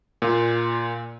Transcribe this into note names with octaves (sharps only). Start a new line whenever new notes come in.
A#2 F4